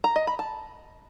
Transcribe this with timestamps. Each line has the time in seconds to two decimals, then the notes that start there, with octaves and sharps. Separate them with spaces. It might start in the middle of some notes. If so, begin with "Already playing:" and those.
0.04 A#5
0.16 D#5
0.27 B5
0.39 A5